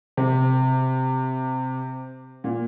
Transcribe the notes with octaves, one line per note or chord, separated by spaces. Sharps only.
C3
A#2